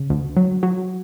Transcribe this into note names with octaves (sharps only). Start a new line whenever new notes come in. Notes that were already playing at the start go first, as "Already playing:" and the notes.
Already playing: C#3
D2
F#3
F#3